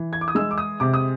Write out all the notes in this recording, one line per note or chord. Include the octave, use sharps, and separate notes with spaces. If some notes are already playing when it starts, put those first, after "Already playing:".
Already playing: E3
G#6
D6
D#6
G#3 E6
D6
D#6
C3 D6
D#6